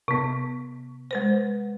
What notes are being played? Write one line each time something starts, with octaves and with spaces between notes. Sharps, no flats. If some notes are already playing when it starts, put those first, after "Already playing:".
C3 B3
G#3 B4 C5